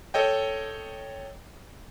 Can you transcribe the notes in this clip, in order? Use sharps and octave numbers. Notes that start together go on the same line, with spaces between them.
A4 C#5 D#5 G5